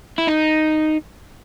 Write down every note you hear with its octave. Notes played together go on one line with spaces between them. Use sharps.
E4
D#4